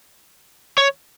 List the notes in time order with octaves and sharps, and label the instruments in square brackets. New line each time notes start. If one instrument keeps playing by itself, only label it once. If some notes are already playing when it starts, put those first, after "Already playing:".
[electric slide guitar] C#5